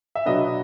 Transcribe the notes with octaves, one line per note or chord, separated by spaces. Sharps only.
E5
B2 F#3 B3 D4 D#5